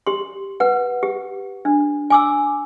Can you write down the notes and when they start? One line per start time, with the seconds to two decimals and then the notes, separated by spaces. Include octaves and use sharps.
0.07 G4 C6
0.60 B4 F#5
1.03 G4
1.65 D4
2.10 G#5 D6 E6